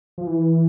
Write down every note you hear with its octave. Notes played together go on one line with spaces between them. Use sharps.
F3
E3